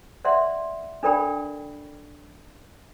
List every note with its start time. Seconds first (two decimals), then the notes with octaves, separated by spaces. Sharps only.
0.25 D5 E5 F#5 C6
1.03 D4 A4 A#4 D5 G5 B5